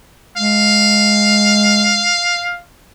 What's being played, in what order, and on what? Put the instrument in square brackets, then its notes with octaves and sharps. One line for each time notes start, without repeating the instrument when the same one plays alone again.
[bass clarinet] G#3 [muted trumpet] F5